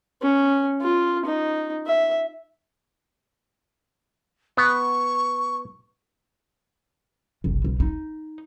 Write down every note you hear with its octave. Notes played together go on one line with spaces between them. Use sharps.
C#4
F4
D#4
E5
B3 C#6
F#1 C2
B1
D#4